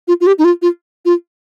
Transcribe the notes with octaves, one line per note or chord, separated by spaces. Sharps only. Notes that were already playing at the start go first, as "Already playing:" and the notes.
F4
F4
G4
D#4
F4
F4
F4